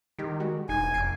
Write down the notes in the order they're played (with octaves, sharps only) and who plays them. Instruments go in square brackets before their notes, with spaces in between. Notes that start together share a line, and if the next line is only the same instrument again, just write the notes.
[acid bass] D#3 [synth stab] G3 D#4 G4
[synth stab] G3 G#3 F#4
[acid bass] E1 [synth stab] D#4 [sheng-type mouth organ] G#5
[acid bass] F1 [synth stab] C7 D7